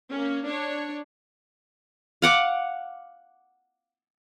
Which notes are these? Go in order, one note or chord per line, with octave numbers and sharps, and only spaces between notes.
A#3 C#4
D4 C#5
F5 F#5 D6